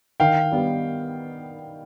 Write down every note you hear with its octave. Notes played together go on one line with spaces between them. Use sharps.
D#3 F5 G5
G3 B3